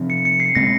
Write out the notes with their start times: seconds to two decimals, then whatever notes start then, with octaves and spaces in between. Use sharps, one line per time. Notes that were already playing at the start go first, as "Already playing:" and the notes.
Already playing: C3 F3 C4
0.10 C#7
0.25 C#7
0.40 C7
0.55 C#3 G#3 C4 A#6